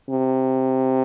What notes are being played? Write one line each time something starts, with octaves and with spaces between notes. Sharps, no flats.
C3